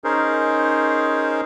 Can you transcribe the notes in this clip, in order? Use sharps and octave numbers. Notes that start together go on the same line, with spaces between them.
C#4 D#4 G#4 A#4 C5